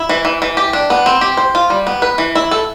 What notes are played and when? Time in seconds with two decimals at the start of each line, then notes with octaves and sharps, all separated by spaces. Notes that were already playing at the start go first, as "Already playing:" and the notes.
Already playing: E4
0.09 E3
0.25 E3
0.42 E3
0.57 G4
0.73 D4
0.90 B3
1.06 C4
1.21 G4
1.37 C5
1.55 F4
1.70 G3
1.87 B3
2.02 B4
2.18 E3
2.35 E4
2.51 A4